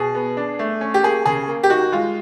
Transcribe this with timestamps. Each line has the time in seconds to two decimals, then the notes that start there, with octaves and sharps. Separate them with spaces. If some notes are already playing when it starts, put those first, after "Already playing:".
Already playing: B2 G#4
0.15 B3
0.37 D4
0.59 A3
0.81 C#4
0.94 G4
1.03 A#3 G#4
1.26 C#3 G#4
1.48 A#3
1.63 G4
1.70 D#4 F#4
1.92 G#3 F4